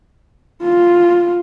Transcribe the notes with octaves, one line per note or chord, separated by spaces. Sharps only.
F4